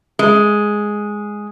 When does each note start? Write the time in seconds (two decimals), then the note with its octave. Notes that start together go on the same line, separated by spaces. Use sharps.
0.19 G#3